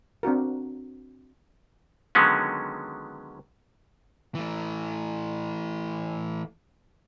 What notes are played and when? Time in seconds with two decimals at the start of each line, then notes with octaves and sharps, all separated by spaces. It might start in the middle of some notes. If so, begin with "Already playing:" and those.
0.23 C4 D4 F#4 A#4
2.15 D3 D#3 F#3 G#3 B3 C#4
4.35 E3 A3